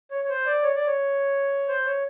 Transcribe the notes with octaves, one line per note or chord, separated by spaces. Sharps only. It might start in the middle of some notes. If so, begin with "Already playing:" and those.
C#5
C#5
C5
D5
C#5
D5
C#5
C5
C#5